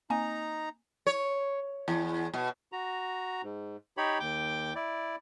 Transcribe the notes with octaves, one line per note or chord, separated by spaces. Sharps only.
A#3 C4 D#4 G#5 A#5
C#5
E2
B2
F#4 A#5
G#2
D#4 G4 C#5 B5
D#2 G5 D6
E4 D5